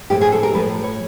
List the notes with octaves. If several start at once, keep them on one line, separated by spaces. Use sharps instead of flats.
A2 F3 A3 G4
G#4
A4
A#4
A2 F3 A3 B4
C#5